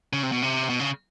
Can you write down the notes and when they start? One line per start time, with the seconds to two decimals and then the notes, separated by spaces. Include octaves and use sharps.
0.13 C#3
0.23 C3
0.32 B2
0.42 C3
0.69 B2
0.80 C#3